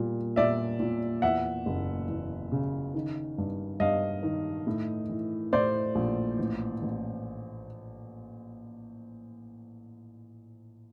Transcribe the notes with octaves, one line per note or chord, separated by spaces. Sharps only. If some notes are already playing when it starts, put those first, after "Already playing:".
Already playing: A#2 G3
A#2 D5 E5
A#2
E2 E5 F#5
F#1
E2
C#3
D#3
G2
G2 D#5 F5
D#3
A2
E3
A2 C5 D5
A#1
A1
A1